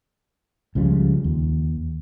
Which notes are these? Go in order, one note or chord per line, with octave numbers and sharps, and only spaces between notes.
C#2 C#3 F3 G3
D#2